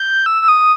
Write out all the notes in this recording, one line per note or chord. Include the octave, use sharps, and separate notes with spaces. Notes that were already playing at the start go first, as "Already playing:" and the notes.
Already playing: G6
E6
E6
D#6